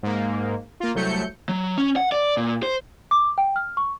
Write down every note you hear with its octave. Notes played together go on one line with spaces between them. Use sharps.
G#2 A#3
A#3 F4
C2 F#3 A3 G6 C#7
F#3
C#4
F#5
D5
A#2
C5
D6
G5
F6
C#6